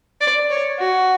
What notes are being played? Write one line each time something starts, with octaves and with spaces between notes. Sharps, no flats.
D5
C#5
F#4